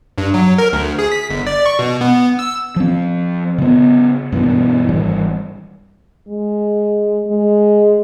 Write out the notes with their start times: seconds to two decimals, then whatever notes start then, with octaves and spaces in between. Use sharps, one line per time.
0.18 G2
0.34 F#3
0.58 A#4
0.73 D2
0.99 G#4
1.12 B6
1.30 G1
1.47 D5
1.66 C#6
1.79 B2
2.01 B3
2.39 E6
2.76 F3 C4
3.58 C#3 B3
4.32 G2 B2 E3
4.89 G#1 E3 G3
6.28 G#3
7.27 G#3